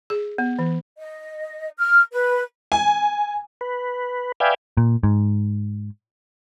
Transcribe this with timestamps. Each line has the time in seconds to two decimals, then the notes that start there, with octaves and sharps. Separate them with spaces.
0.10 G#4
0.38 B3
0.59 E3
0.98 D#5
1.78 F6
2.13 B4
2.72 G#5
3.61 B4
4.40 B4 D5 E5 F5 G5 G#5
4.77 A#2
5.03 G#2